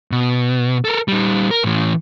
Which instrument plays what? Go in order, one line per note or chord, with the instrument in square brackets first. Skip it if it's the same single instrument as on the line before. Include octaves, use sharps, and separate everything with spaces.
[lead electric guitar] B2
A4 A#4
G3 D#4
A#4
A2 E3